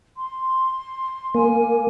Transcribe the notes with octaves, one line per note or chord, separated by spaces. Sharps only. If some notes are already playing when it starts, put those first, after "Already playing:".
C6
A#3 G#5